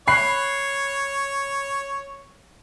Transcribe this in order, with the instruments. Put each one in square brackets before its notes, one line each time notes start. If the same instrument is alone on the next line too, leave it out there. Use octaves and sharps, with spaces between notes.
[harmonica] C#5 [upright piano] B5 F#6 C7